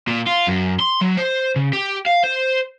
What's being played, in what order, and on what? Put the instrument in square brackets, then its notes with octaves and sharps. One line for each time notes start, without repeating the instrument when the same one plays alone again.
[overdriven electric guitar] A#2
F4
F#2
C6
F#3
C5
C#3
G4
F5
C5